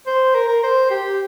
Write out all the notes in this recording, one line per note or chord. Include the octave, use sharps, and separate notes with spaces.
C5
A#4
A#4
C5
G4